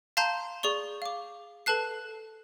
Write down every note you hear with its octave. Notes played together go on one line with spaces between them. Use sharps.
F5 A5 A#5 C6 G6
G#4 D5 C#6 G7
F5 D6
A4 B4 A5 F#6 C7